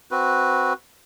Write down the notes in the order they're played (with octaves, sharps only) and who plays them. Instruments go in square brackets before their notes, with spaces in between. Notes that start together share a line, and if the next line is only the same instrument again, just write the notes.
[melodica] C4 F#4 B4